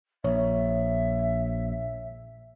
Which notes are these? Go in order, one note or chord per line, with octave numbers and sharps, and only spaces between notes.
A#1 C#5 E5